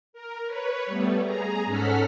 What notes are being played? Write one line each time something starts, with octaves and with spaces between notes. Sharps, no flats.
A#4
B4 C#5
G3 A3 B3
G#4 A#5
G#2 C#4 A4 F#5 F6 B6